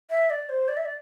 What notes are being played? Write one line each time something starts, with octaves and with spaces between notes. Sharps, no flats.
E5
D5
C5
D5
E5
D5